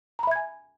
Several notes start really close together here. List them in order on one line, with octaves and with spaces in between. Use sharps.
A#5 B5 E5 G#6 G#5